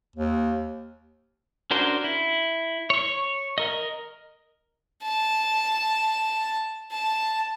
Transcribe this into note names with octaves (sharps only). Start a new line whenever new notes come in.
D#2
C#4 D4 F#4 A#4 C5
E4
C#5 C#6
A#4 D#5
A5
A5